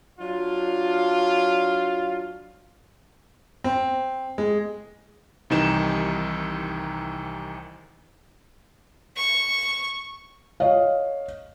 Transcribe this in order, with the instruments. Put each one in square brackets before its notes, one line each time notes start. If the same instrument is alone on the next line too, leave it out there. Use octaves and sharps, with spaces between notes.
[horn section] F#3 D4 F4
[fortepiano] C4
G#3
[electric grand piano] C2 C3 D#3 E3 D#4 E7
[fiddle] C#6
[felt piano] C#5 D#5 F5